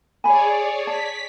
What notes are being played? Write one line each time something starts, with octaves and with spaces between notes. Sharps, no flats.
G#4 C#5 D5 G#5 B5
A5 B6